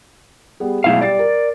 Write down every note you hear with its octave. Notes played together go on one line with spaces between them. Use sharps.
G3 B3 G#4
B2 F#3 G#3 A3 E4 F5
G3 D5 A6 C7
A#4